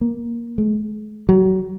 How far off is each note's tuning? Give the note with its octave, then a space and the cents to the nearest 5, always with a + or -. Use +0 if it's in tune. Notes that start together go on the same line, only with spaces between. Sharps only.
A#3 +10
G#3 +40
F#3 +30